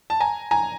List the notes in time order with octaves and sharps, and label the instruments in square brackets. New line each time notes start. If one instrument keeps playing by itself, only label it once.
[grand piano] A5
G#5 A#5
G#5 A#5